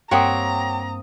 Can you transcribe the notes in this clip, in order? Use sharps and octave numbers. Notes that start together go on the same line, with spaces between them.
G2 A#3 C4 G4 C#5 F#5 A#5 D#6